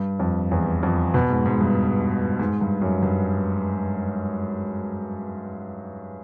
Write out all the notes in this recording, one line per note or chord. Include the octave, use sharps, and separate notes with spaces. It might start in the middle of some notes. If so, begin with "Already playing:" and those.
Already playing: G2
F2
E2
F2
B2
G#2
G#2
G2
G#2
G2
F#2
G2